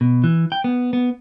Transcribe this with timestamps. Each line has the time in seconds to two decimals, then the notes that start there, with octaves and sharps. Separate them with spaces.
0.01 B2
0.24 E3
0.52 G5
0.64 B3
0.93 B3